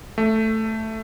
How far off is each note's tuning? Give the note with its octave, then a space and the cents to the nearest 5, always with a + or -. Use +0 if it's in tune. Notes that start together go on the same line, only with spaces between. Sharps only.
A3 +5